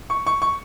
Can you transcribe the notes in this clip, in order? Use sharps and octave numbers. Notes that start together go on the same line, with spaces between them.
C#6
C#6
C#6